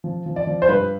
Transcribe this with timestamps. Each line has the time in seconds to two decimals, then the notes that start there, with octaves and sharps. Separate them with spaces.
0.04 F3
0.26 F3
0.36 D5
0.47 F3
0.62 C5
0.68 G2 B4